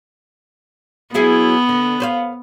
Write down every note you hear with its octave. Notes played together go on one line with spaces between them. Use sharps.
F#3 B3 E4 G#4
D3
B4 C5 F5